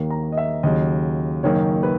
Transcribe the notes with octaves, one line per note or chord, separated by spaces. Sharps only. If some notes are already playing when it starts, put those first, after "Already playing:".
Already playing: D#2 D#3 A#3
A#5
D#5
E5
D#2 C#3 F#3 D#5
F#1 F#2 D#3 A#3 C#5
B4